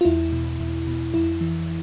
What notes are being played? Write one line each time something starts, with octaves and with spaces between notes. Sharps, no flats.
F4
E2 E4
B2
E2
B2
F2 E4
E3